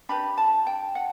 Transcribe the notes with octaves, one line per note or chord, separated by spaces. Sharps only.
D4 G4 B4 B5
A5
G5
F#5